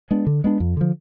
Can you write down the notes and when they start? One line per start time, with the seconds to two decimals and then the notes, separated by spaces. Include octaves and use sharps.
0.11 G#3 B3 D4
0.27 D3
0.44 G#3 B3 D4
0.60 F2
0.77 D3 F3